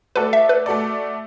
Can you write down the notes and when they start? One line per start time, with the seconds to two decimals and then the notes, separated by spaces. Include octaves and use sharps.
0.16 A3 F#4 A4 B4 D5
0.33 E5
0.49 B4
0.66 A3 F#4 A4 D5